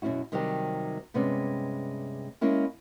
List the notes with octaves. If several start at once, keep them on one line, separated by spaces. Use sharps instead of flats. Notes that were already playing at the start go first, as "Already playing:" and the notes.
F#2 B2 C#4 E4 F#4
C3 D#3 F#3 G3 C4 G4
G2 C3 G#3 B3 C#4 D5
G#3 A#3 C#4 E4 A#4